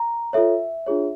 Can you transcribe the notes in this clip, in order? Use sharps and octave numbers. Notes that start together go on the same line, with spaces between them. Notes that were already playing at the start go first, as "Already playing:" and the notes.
Already playing: A#5
F4 A4 C#5 E5
D4 F4 G#4 C#5